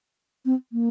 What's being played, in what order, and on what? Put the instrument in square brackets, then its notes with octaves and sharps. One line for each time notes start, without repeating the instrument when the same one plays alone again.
[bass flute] C4
A#3